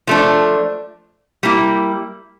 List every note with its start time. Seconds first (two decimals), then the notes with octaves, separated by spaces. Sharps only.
0.07 F3 A3 D4
1.43 G3 A#3 E4